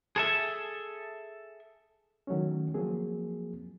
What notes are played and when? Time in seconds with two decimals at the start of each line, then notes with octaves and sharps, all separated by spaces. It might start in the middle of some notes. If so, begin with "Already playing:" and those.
0.16 G#4 A4 E5
2.27 D#3 F#3 A3 C#4
2.74 F3 F#3 A#3 C4 G#4